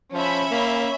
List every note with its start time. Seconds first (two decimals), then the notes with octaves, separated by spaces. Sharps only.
0.13 F3 C#4 E5 B5
0.51 A#3